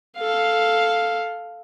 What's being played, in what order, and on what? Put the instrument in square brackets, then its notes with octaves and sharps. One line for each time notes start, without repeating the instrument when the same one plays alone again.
[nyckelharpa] A4 F5